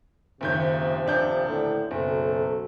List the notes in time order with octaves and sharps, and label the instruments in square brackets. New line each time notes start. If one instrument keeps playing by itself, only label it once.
[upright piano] F#1 D#2 G6 [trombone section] C3 F3 C4
[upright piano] D#1 D4 G6
[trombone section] A2 D3
[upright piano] F#1 [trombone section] B1 F#3 A4